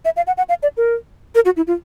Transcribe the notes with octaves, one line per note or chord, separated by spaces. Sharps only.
E5
F5
F#5
F#5
F5
D5
A#4
A#4
F#4
E4
F4